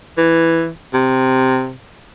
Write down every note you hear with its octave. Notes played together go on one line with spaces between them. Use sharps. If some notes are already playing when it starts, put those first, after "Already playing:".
E3
C3